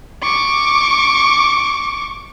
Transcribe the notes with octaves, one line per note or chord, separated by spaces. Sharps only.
C#6 D6